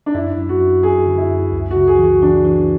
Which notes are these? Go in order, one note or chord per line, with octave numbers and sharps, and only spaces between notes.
D4
F#2 E4
F#2
F#4
F#2
F#2 G#4
D3
E4
F#2
C#2
F#4
C#3
G#4
E3
F#4
E3 D4
E3